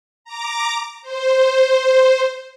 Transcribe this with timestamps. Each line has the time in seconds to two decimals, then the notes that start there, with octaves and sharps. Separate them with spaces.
0.24 A#5 D6
1.02 C5